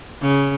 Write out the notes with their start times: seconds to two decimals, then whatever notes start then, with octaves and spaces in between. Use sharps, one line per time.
0.22 C#3